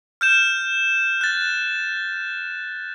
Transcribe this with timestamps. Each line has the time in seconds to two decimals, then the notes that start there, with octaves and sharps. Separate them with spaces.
0.21 F6 G6 E7
1.21 F#6 A6